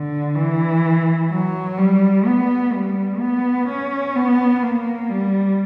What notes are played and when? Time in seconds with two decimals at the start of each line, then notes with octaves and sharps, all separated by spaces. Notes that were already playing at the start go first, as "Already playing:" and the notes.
Already playing: D3
0.36 E3
1.30 F#3
1.77 G3
2.26 B3
2.73 G3
3.20 B3
3.68 C#4
4.15 B3
4.62 A#3
5.09 G3